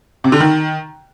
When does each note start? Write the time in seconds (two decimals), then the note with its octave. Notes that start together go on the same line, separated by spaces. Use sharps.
0.24 C3
0.32 D3
0.40 D#3